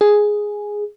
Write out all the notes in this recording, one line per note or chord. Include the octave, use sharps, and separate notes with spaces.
G#4